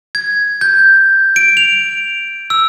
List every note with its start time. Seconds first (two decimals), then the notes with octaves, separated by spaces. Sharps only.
0.15 G#6
0.61 G6
1.36 D7
1.57 F7
2.50 E6